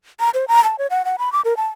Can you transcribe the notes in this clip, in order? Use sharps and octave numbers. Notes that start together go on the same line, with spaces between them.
A#5
C5
A#5
A5
C#5
F#5
F#5
B5
D6
A#4
A5